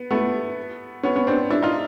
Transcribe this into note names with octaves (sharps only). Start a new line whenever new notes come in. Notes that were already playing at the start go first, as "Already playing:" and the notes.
Already playing: B3
A3 B3
B3 C#4
B3 C#4
C4 D4
D4 E4
D#4 F4